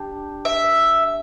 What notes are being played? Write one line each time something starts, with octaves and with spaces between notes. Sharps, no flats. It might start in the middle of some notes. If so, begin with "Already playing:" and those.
Already playing: D4 G4
E5